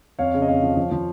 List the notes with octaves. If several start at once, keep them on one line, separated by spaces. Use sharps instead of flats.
F2 C#5 F5
C#3
D#5
F2 C#5 F5
F3
F3
F3